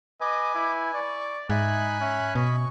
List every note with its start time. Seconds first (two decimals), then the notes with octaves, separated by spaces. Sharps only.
0.21 B4 D#5 G#5 D6
0.55 E4
0.94 D5 C#6
1.50 G#2 D#4 E5 G#5 B5 F#6
2.00 C#4 E5
2.35 B2 D#5 B5 C#6